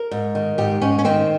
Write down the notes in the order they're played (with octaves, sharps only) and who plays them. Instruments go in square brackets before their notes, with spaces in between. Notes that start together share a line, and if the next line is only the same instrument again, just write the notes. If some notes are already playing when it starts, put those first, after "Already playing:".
Already playing: [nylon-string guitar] A#4
G#2
D#3
G#2 G4
G#2 C#4
C#4
D#3 C4